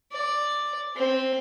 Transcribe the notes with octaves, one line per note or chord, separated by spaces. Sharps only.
D5
C4